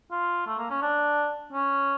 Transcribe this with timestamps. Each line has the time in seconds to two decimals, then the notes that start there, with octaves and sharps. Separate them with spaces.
0.11 F4
0.46 A3
0.58 A#3
0.70 C#4
0.82 D4
1.53 C#4